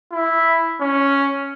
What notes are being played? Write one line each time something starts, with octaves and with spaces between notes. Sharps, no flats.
E4
C#4